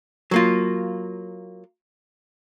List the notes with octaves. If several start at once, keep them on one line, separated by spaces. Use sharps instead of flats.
F#3 A#3 F4